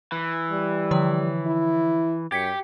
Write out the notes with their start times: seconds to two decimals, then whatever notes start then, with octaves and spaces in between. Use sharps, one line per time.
0.12 E3
0.51 G3
0.91 D3 F3 C#5
1.47 E4
2.32 F#2 G4 G#6 B6 C#7